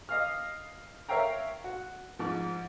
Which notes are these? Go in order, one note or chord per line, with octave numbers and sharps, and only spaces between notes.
D#5 F5 F6
A#4 C#5 E5 F5 G5 A#5
F#4
G#2 F3